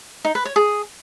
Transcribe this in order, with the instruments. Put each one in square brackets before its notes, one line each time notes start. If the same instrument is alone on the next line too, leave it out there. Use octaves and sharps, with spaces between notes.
[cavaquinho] D#4
B4
C#5
G#4